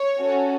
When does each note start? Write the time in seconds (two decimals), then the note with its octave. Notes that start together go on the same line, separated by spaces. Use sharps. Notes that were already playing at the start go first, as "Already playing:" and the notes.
Already playing: C#5
0.18 C#4 F#4 A4